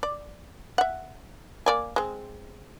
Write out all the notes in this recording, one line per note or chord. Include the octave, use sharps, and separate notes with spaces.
D5
E5 F#5
A#3 D5 G#5
G#3 C4